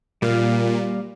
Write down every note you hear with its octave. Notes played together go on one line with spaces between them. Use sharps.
A#2 G3 F5